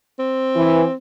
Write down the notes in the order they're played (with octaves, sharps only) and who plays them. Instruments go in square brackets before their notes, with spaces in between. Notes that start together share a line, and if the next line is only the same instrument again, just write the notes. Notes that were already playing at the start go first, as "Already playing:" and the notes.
[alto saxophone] C4
[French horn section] E3